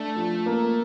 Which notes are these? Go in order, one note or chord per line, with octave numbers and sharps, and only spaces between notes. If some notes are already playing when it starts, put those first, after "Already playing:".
Already playing: A3 D4
F3
A#3